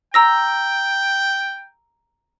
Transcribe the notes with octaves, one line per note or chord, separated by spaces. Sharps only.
G5 A#5 E6 A#6